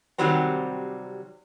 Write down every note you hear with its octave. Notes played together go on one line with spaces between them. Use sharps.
C3 D#3 F#3 G3 C4